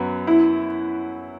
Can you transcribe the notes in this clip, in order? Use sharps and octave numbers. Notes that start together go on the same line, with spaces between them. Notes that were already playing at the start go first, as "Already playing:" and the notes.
Already playing: F#2 F#3 B3
E4